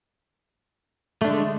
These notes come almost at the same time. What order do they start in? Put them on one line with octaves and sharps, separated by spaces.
A3 D4 D3 G#3